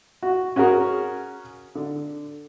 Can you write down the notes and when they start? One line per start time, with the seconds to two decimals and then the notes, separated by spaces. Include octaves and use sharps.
0.23 F#4
0.56 C#4 F#4 G#4 A#4
1.75 D3